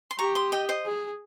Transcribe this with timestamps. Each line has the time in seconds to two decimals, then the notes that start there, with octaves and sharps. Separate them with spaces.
0.11 C6
0.18 G4 A#5 C#6
0.35 C6 D#6
0.52 D#5 G5
0.69 C5 D#5
0.86 G#4